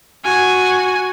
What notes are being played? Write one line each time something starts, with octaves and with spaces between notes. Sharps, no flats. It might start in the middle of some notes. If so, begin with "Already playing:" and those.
F#4 G#5